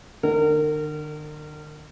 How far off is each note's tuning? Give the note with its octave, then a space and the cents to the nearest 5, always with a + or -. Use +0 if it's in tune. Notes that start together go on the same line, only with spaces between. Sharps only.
D3 +40 A#4 -30